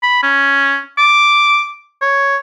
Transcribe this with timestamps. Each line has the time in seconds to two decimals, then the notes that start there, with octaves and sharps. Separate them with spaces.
0.03 B5
0.23 C#4
0.98 D6
2.02 C#5